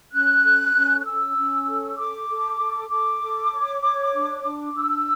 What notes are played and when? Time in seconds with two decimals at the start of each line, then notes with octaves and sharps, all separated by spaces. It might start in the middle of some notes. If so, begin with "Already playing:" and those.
0.13 C#4 F#6
0.44 A4
0.75 C#4
1.00 F#6
1.06 C#4 E6
1.37 C#4
1.67 A4
1.97 A4 D6
2.29 A4
2.60 A4
2.90 A4 D6
3.21 A4
3.52 C#5
3.82 C#5
4.14 D4
4.44 D4
4.74 D4 E6